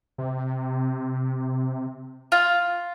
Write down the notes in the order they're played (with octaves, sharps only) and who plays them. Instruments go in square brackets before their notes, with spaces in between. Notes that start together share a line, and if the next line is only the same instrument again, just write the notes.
[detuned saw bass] C3
[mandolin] F4